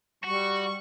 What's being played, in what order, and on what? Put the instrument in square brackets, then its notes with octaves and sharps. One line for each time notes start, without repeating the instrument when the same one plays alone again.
[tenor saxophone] G3 [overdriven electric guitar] F#4 [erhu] C#6